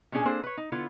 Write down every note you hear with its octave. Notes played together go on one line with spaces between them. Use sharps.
A#2 F#3 C#4 D4 G#4 G#5
A#3 C4 D4 G#4 A4 C5
B4 C#5
D#4
D3 B3 E4 F4